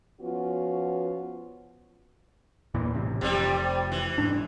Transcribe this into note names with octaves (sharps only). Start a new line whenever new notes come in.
F3 B3 C#4 F4 F#4
E2 A#2 E3
A1 C3
F1 C3 G3
E3
F1 G#2 D4